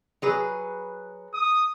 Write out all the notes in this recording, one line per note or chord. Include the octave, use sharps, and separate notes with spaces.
F#3 G#4 B4
D#6